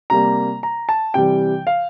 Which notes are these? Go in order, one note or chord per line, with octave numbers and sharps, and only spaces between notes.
C3 G3 A#3 A#5
A#5
A5
C3 E3 G3 G5
F5